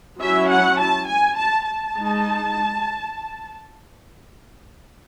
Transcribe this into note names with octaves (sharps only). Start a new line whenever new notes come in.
F#3 C#4 E4 E5
F#5
A5
G#5
A5
A5
G#3 D#4